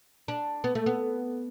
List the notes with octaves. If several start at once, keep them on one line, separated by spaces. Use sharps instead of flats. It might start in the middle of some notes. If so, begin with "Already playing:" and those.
D4
B3
A3
B3